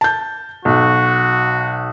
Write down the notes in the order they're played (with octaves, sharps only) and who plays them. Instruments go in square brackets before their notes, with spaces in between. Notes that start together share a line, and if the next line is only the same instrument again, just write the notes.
[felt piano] A5 G6
[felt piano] B1 [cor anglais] F#4